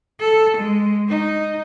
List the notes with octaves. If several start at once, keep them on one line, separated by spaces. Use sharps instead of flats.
A4
G#3
D#4